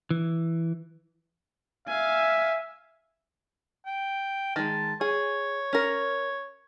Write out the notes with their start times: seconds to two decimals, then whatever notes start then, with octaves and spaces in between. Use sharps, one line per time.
0.11 E3
1.88 E5 F5 G#5
3.86 G5
4.56 D#3 G#3 A5
5.01 G#4 C#5
5.73 C#4 A#4